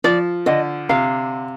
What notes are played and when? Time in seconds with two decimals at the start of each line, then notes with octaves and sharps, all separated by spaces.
0.04 F3 D5
0.46 D3 D#5
0.89 C3 F5